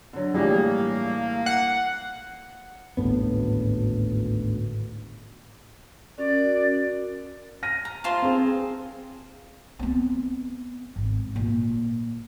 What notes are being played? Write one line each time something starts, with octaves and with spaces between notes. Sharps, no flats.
D3 F#3
A2 E3 G3 A#3 F4 G#4
F#5 C7
G#1 D2 A2 B3
C#4 F#4 A#4 D5
F6 A#6 D#7
A#5
F4 C5 A5
C4 G#4
B3 C4
G#1
A#2